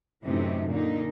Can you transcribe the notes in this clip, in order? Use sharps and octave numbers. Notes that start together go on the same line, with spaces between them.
F#2 A2 C3 E3 D#4
A#2 D3 A#3 D#4